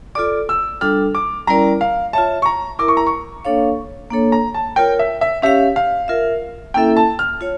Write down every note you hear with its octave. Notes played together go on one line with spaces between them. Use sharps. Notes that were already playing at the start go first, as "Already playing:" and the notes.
F4 A4 D5 D6
E6
G3 D4 F4 A4 F6
D6
G3 C#4 E4 A#4 D5 A#5
F5
F4 C#5 E5 A5
C#6
A#5
E4 A#4 E5 D6
C#6
A#5
C#6
A#3 D4 A4 C#5 F5
A#3 D4 A4 C#5
A#5
A5
F4 A#4 C#5 G5
E5
E5
C#4 G4 C#5 E5 F5
F5
F4 A#4 E5
A#3 C#4 E4 A4 E5 G5
A5
F6
F4 C#5